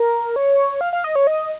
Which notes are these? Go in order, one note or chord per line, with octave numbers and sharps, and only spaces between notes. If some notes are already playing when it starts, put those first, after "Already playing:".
Already playing: A#4
C#5
F5
F5
D#5
C#5
D#5